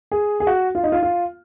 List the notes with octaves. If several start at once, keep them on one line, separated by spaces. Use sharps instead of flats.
G#4
G#4
F#4
F4
D#4
F4
F4